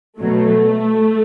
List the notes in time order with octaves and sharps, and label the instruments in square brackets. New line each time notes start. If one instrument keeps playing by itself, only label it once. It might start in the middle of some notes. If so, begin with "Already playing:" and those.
[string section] B2 F#3 A3